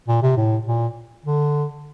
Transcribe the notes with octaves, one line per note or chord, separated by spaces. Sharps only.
A#2
C3
A2
A#2
D3